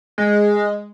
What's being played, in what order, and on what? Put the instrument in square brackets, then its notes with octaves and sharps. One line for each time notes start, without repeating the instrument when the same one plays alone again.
[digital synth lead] G#3